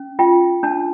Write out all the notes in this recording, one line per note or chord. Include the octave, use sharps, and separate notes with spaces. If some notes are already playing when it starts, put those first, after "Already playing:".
Already playing: C#4
F4 G5
D4 A5